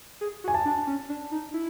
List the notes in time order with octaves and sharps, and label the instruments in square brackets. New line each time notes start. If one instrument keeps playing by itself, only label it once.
[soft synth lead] G#4
F#4
[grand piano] G#5
A5
[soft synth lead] D4
C#4
D4
D#4
E4